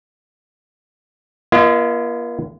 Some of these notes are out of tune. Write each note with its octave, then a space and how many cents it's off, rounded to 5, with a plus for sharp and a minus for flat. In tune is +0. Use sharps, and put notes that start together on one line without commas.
A#3 +40 F4 -40 D#5 +0